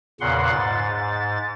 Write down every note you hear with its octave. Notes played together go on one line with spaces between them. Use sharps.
E2 A#2 C#3 F#5 C6
G#2 A6